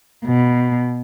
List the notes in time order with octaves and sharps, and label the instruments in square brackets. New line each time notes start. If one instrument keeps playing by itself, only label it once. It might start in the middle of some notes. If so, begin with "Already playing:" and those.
[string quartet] B2